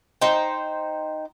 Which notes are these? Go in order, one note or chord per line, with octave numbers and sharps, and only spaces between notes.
D#4 C5 G5